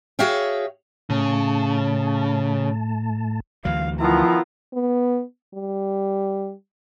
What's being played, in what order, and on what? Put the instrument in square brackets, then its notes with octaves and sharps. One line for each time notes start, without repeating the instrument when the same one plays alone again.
[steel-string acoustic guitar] F#4 G#4 C#5 E5 F5 G5
[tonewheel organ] A2 A3 A5 [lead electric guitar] C#3
[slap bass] D2 E3 F#3 [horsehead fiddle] F5
[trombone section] D#3 B3 E4 [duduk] F3 [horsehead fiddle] F4 A#5
[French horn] B3
G3